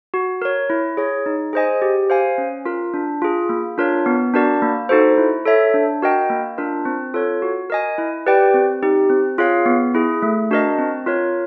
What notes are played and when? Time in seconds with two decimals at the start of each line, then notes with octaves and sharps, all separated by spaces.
0.14 F#4
0.42 A#4 C#5
0.70 E4
0.97 G#4 C#5
1.26 D#4
1.53 G#4 C5 D#5 G#5
1.82 G4
2.10 C5 F5 G#5
2.38 C#4
2.65 F4 A#4
2.94 D4
3.22 F4 G#4
3.49 A#3
3.78 D4 F4 A#4 C#5
4.06 B3
4.34 D4 F#4 A#4 D5
4.62 A#3
4.89 D#4 F#4 A4 C5
5.18 E4
5.46 A4 C#5 E5
5.74 D4
6.02 F#4 A#4 D#5 G5
6.30 A#3
6.58 D4 F4 A#4
6.85 C4
7.14 F4 A4 C#5
7.42 F#4
7.70 A#4 D#5 G#5
7.98 E4
8.26 G4 B4 D5 G5
8.54 C4
8.83 D#4 G4
9.10 C4
9.38 F4 G#4 C#5 F5
9.66 B3
9.94 E4 G#4
10.22 A3
10.51 D4 F#4 A#4 D#5
10.78 C4
11.06 F4 A#4 C#5